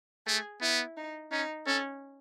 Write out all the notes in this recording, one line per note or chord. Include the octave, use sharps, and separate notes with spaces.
A3 G#4
B3 E4
D#4
C#4 D#4
C#4 A4